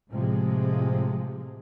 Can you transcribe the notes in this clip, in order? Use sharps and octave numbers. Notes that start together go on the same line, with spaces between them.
A2 C3 F3 G#3